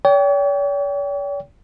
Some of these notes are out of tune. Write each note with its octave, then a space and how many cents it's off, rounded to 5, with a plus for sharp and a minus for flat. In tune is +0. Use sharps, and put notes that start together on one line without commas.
C#5 +45 G5 +0